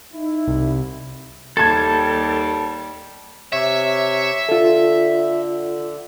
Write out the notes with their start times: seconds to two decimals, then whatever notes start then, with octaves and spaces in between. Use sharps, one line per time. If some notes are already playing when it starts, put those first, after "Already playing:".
0.12 D#4 E4
0.47 C2
1.57 D#2 G3 A4 A5 G#6
3.53 C3 C#5 E5 C#6
4.49 D3 F4 A4